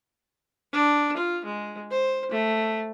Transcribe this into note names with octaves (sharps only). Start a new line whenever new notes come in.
D4
F4
G#3
C5
A3